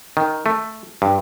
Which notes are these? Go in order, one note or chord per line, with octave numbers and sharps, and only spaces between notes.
D#3
A3
G2